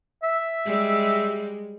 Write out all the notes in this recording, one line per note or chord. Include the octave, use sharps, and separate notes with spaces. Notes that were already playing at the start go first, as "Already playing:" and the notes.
E5
G3 G#3